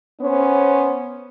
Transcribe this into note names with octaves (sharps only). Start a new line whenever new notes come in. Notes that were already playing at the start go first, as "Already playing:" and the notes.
B3 C#4 C5 C#5